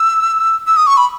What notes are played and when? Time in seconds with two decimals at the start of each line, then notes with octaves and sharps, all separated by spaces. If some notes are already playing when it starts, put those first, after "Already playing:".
Already playing: E6
0.67 E6
0.77 D#6
0.87 C#6
0.97 B5